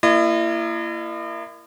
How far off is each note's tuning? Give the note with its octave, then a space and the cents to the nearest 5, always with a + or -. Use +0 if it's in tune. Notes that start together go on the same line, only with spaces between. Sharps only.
A#3 +0 E4 +35 D#5 -40